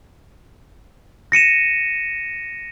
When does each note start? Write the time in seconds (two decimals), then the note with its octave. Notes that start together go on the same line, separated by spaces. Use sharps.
1.32 A#6 C#7 D#7 E7